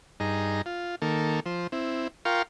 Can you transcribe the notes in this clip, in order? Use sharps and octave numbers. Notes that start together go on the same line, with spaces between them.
G2 D#4 G#4 A#5
F4
D#3 A#3 A4
F3 C5
C4 E4
F4 A#4 F5 G5 C6 C#6